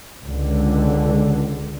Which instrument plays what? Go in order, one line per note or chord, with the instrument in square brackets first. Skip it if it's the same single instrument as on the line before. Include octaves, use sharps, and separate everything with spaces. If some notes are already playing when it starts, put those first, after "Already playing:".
[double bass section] C#2 D3